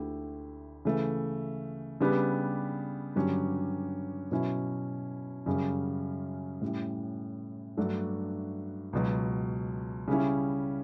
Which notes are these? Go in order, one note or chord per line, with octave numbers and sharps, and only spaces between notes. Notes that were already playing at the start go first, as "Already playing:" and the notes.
Already playing: D2 D3 A3 E4 G4
C#3 E3 A3
C#3 G3 B3 D4 G4
G2 D3 F#3 C#4 G4
B2 F#3 C#4 E4
F#2 C#3 G3 C#4 F#4
A2 G3 C#4
G2 F#3 A3 D4 F#4
C#2 B2 F#3
C#3 G3 C#4 E4